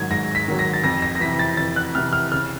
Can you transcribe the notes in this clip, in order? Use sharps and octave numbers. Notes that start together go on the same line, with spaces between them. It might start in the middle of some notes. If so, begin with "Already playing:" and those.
Already playing: G#2 D#3 F#3 G#6
G#2 A#6
B6
D#3 F#3
A#6
A6
F2 A#6
A#6
A#6
C3 E3 B6
A6
F2 A6
F#6
C3 E3 F6
F6
C#3 F6